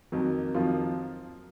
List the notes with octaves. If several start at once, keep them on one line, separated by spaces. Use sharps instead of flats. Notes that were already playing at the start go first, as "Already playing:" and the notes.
F2 D#3 F#3 A#3
F2 D#3 F3 F#3 A#3 F4